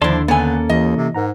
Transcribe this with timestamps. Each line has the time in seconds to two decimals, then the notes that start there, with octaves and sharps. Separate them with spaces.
0.02 D#2 D3 F3 E4 D5 A5 C6
0.28 D3 A#3 B3 C#4 A4 G#5
0.69 D#2 E3 D#5
0.96 C3
1.14 G#2 A#4 F#5 A#5